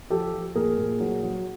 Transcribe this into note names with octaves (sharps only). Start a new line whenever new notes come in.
F3 G4 A4
F3
A#2 G#4 A#4
A#2
F#3
F#3